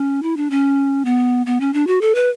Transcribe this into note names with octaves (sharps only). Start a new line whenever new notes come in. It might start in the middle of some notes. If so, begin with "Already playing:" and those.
Already playing: C#4
E4
D4
C#4
B3
B3
C#4
D4
F#4
A4
B4